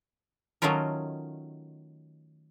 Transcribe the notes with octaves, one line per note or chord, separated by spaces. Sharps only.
D#3 F#3 A3 C#4 F4 A#4